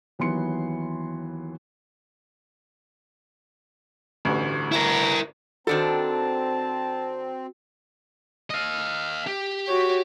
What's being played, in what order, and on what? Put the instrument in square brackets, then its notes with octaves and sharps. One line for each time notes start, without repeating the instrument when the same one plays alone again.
[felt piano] D#2 E3 F#3 B3 C6 C#7
[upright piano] A1 D2 G2
[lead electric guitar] E4 A#4
[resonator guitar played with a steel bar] D#3 D4 A4 [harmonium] C4 [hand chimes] F#4 [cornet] A5
[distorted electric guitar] D#5 F5
G4
[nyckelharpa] F#4 C#5